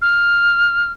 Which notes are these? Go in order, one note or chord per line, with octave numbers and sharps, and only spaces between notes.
F6